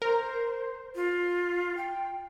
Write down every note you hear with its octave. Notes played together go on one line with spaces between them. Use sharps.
A#4 C5
F4
G5